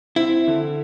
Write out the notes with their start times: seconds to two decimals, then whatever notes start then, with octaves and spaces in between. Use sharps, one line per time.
0.16 C4 E4
0.47 D3